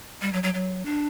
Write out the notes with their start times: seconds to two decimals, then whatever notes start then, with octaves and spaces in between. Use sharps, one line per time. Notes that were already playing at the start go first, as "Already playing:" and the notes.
0.22 G3
0.33 F#3
0.43 F#3
0.54 F#3
0.85 D4